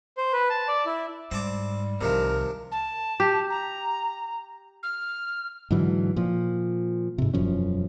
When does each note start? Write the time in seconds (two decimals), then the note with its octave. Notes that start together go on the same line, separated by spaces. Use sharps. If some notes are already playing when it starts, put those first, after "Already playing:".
0.17 C5
0.33 B4
0.50 A5
0.68 D5
0.86 E4
1.31 G#2 G3 C4 A5 D6
2.01 C2 C3 D#3 F3 A#4
2.71 A5
3.20 G4
3.49 A#5
4.83 F6
5.71 G#2 D3 E3 F#3
6.16 A#2 F3
7.18 G#2 C3
7.33 E1 F#2 F3 C#4